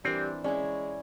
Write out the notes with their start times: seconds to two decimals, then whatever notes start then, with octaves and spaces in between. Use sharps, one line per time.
0.05 E3 G3 C4 D4 A#4
0.44 G#3 C#4 E4 D5 G#5